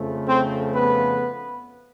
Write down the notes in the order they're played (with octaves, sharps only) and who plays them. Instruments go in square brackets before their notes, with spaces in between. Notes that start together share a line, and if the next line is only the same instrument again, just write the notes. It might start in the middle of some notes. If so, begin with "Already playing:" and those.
Already playing: [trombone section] F2 C#3 F3 A3
C4 C5
B3 B4